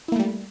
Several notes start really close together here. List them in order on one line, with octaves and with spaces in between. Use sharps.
E4 A#3 A3 G3